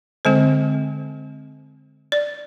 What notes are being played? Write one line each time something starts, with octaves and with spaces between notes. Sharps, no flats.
D3 G#3 C4 C5
D5